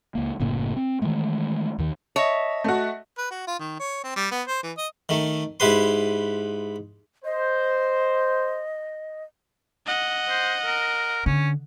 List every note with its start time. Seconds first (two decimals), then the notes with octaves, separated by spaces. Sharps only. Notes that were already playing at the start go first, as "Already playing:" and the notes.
0.15 C#2 A#3
0.40 F#1 A2 C#3 A#3
0.76 C4
1.02 D#3 E3 G#3 A3
1.78 D#2 D#3
2.16 C#5 D#5 E5 A5
2.64 A3 F#4
3.18 B4
3.31 F#4
3.47 F4
3.59 D#3
3.80 C#5
4.04 C4
4.16 G3
4.31 B3
4.48 C5
4.63 E3
4.77 D#5
5.09 D#3 A3
5.60 G#2 E4 G4 B4 C6
7.25 C5 D#5
9.86 D#5 F#5
10.30 C5
10.66 A#4
11.26 D3 C#4